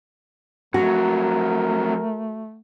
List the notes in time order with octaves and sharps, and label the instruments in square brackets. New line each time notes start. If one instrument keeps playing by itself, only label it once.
[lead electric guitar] F2 F#3 [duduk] A3 [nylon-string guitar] F#4 [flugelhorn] A#4